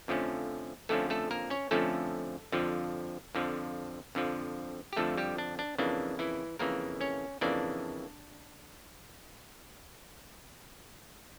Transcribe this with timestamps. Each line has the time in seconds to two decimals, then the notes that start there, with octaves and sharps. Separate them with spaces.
0.08 F2 D3 F3 A3 C#4
0.89 F2 D3 F3 A3 C#4 A4
1.10 A3 A4
1.31 A#3 A#4
1.50 C#4 C#5
1.71 F2 D3 F3 A3 C#4 A4
2.52 F2 D3 F3
3.35 F2 D3 F3
4.15 F2 D3 F3
4.93 G4
4.97 F2 D3 F3 A3 A4
5.18 G3 G4
5.38 D4
5.59 D4
5.78 F2 C#3 E3 A#3 D4
6.19 E3 E4
6.59 F2 C#3 E3 A#3 A#4
7.01 C#4 C#5
7.41 F2 C#3 E3 A#3 D4 D5